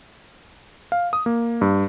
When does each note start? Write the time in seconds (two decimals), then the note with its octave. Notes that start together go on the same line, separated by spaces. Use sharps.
0.92 F5
1.13 D#6
1.26 A#3
1.61 G2